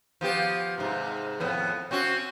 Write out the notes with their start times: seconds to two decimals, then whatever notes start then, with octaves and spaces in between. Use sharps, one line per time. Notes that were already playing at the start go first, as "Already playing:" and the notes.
0.21 F3 B3 G4
0.78 G#2 C3
1.40 F2 A2 B3
1.91 C4 C#4 F#4